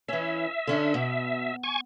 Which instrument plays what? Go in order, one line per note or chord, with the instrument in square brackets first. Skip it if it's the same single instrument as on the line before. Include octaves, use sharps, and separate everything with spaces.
[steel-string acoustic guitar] E3 C#4 [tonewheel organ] E5
[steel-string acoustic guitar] D3 C#4 D4
B2
[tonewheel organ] G#5 C#6